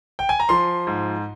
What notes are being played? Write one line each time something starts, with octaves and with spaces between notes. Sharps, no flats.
G5
G#5
A#5
F3 C6
G#2